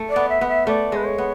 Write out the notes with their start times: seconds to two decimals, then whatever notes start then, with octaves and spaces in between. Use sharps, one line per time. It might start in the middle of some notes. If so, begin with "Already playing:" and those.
Already playing: A3
0.10 D5
0.16 B3
0.29 E5
0.41 B3
0.48 E5
0.67 A3 D5
0.92 G#3 B4
1.05 C#5
1.18 B3